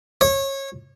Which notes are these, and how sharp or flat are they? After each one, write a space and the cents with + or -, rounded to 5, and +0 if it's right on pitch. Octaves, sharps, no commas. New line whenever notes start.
C#5 -25